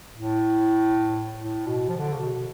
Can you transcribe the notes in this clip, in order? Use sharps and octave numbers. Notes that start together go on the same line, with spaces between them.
A2
A2
B2
F3
D3
C#3
B2